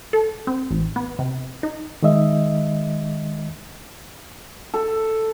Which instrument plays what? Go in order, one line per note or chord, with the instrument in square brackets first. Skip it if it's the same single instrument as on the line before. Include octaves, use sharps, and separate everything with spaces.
[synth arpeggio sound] A4
C4
A1
B3
C3
D#4
[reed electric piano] D#3 G#3 D#5 E5
[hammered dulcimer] A4